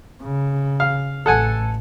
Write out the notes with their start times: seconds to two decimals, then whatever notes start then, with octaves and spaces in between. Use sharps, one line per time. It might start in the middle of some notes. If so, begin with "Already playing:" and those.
0.22 C#3
0.80 F5
1.26 A1 A4 F#5 G#5